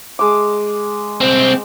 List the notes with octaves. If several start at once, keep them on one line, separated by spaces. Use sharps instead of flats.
G#3 D6
C2 C4